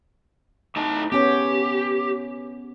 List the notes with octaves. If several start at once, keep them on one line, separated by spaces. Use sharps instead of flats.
A2 D#4 A5
B3 C#4 G4 C#5